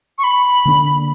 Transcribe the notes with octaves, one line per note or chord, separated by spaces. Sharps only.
C#6
B5
D3 A#3 D4